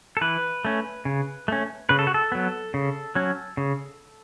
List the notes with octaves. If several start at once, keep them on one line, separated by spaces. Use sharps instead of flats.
A4
E3 B4
A3 C#4
C#3
A3 C#4
C#3 B4
A4
F#4
A4
F#3 B3
C#3
F#3 C#4
C#3